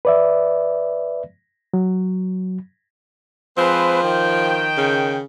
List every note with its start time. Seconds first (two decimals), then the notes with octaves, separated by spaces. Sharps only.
0.05 B4 D5 E5
1.74 F#3
3.58 F3 G#3 C4 B4
4.04 D#3 G5
4.77 C#3